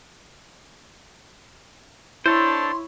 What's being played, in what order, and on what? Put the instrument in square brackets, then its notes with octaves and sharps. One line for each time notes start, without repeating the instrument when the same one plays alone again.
[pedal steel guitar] D4 A4 C5 [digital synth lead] E4 [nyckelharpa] C#5 B5 [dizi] C6